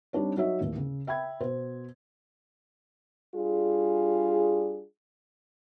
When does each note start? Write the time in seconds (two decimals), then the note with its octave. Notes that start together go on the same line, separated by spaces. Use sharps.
0.13 G3 C4 D4 D#4 C#5
0.36 F#3 D#4 F#4 C#5 D#5 E5
0.60 A1 D#2
0.77 C#3
1.07 E5 G5 B5 G#6
1.40 B2 C5
3.35 G3 D4 F4 G#4